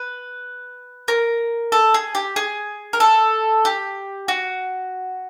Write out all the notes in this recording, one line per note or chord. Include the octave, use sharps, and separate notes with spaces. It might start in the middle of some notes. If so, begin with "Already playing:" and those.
Already playing: B4
A#4
A4
G#4
G4
G#4
A#4
A4
G4
F#4